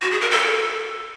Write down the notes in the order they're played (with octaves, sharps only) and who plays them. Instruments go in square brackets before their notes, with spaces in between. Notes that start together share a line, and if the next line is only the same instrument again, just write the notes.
[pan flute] F#4
G#4
A#4
A4